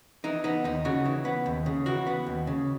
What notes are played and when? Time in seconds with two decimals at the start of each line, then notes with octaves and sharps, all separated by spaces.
0.24 E3 D#4
0.44 B3 D#4
0.64 D#2 D#4
0.85 C#3 F#4
1.05 E3
1.25 B3
1.46 D#2
1.66 C#3
1.86 E3 F#4
2.07 B3
2.27 D#2
2.47 C#3